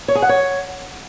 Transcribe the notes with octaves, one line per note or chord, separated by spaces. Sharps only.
C#5
G#4
F#5
C#5